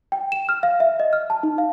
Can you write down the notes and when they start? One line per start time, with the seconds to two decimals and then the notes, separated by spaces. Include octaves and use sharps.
0.12 G5
0.32 E7
0.49 F6
0.63 F5
0.80 E5
1.00 D#5
1.13 F6
1.30 A5
1.43 D#4
1.58 F5